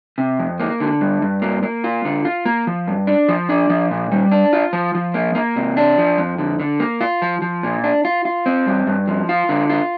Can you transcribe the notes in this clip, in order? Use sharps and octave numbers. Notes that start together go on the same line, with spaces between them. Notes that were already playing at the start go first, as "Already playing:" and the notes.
C3
F2
A#3
D3
G2
G2
A#3
A#3
F4
D3
F4
A#3
F3
G2
D4
F3
D4
F3
A#2
G3
D4
F4
F3
F3
A#3
A#3
C3
D4
F3
F2
D3
D3
A#3
F4
F3
F3
A#2
D4
F4
F4
C4
G2
G2
F3
F4
D3
F4